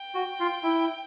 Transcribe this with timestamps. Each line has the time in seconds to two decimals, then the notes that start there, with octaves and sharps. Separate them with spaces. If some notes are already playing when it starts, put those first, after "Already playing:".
Already playing: G5
0.15 F#4
0.40 F4
0.63 E4